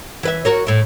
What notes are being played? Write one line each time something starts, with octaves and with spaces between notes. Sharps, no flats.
E3 B4 E5
F#4 A#4 C#5
A2 E4